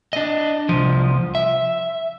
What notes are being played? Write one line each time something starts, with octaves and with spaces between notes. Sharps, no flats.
D4 D#5
C2 F3
E5